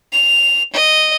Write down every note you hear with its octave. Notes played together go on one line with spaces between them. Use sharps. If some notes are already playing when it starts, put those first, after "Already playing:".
F7
D#5